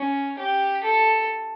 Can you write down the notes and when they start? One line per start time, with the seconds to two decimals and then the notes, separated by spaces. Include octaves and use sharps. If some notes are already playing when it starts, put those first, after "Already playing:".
Already playing: C#4
0.39 G4
0.84 A4